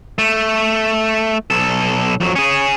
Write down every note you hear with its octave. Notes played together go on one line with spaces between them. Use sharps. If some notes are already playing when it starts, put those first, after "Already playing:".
A3
B1 A4
F2 F#3
C#4 G#4